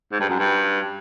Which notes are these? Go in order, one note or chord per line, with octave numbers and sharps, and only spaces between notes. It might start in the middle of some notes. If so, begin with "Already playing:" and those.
G#2
G2
F#2
G2